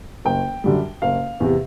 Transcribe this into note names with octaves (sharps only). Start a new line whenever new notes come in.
F#1 G5
F#2 D3 G3
F#1 F5
E2 C3